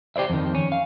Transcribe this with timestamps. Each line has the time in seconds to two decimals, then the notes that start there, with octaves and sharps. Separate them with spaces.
0.16 G4 C5 D5 E5
0.30 F2 D#3
0.55 C#4
0.72 F5